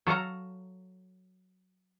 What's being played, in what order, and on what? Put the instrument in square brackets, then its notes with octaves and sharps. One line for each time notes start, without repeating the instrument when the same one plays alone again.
[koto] F#3 A4 F5 A#5